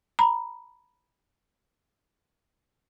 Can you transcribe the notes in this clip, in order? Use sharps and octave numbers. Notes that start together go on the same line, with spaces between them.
A#5 B5